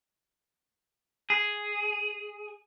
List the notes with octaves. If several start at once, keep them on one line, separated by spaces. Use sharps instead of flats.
G#4